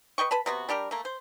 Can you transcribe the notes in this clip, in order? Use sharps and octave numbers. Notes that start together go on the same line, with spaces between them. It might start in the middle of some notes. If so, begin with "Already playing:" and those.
B4 D#5 G5 C#6
B4 A5 B5
C3 B3 F#4
G3 D4 G4 A#4
A3 A#3
C5